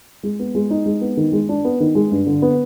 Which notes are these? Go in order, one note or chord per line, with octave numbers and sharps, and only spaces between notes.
G#3
B3
G#3
D#4
G#3
B3
D#3
G#3
D4
B3
D#3
G#3
G2
D3
B3